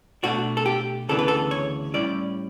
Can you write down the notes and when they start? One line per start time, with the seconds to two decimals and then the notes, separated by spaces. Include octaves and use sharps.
0.23 B2 A3 D4 F#4
0.57 A4
0.66 G4
1.09 D2 C#3 E3 B3 D4 A4
1.19 B4
1.28 A4
1.51 C#5
1.94 A2 G3 C#4 E4 D5